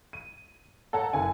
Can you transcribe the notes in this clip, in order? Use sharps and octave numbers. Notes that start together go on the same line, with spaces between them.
D#7
A4 C#5 F#5 A5 A#5
F#1 A4 G#5